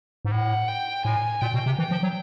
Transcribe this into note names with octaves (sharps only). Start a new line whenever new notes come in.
G#2
A2 F#5
G5
A2 G#5
A#2 G5
B2
C3
E3 G5
F3
F#3